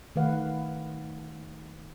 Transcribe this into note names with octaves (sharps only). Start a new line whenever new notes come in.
D#3 A3 B4 F5 F#5